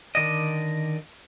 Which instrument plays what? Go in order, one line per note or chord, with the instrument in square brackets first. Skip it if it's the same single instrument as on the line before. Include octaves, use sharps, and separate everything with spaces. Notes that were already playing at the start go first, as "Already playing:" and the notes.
[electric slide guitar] D3 D#3 D5 D#5